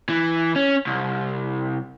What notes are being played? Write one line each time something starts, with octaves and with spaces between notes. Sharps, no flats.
E3
C#4
C2